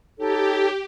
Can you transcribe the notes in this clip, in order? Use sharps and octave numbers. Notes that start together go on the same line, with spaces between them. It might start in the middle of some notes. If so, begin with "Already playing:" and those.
D#4 G4 A4 C#5